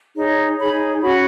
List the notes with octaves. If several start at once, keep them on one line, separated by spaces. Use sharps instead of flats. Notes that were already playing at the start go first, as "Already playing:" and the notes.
D#4 G#4 C#5
D#4 G#4 C#5 B5
C#4 F#4 C#5 B5